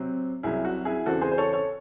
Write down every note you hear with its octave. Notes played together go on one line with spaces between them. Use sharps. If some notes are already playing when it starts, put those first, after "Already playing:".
Already playing: C3 F#3 C4
C2 C3 F#3 E4 G#4
F#4
E4 G#4
E2 C#3 E3 C4 F#4 A4
G#4 C5
C5
A4 C#5
A4 C#5